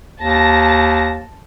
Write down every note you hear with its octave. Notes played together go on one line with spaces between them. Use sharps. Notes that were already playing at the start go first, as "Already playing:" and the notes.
D#2 A5 A#6